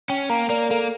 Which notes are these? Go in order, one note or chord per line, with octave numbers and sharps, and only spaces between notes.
C#4 G5
A#3 A#5
A#3 D5
A#3 A4